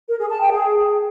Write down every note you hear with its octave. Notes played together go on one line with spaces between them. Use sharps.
A#4
G#4
A5
G5
G#4